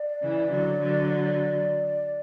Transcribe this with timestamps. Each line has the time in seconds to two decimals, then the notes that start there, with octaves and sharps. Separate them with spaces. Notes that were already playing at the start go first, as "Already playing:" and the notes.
Already playing: D5
0.22 C#3 E3
0.51 D3 F#3
0.80 D3 F#3